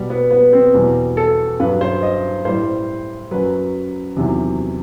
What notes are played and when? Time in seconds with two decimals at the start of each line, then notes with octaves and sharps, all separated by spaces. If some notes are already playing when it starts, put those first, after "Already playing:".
Already playing: B2 G3
0.10 B3
0.31 B3
0.53 C4
0.74 E2 B2 G3
1.17 A4
1.60 G2 B4
1.64 F#3
1.81 C5
2.03 D#5
2.45 A2 G3 C5
3.31 F#2 F#3 B4
4.16 E2 C3 D#3 F#3